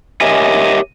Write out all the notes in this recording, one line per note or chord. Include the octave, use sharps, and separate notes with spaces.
G4 A#4 C#5 D#5 E5 G#5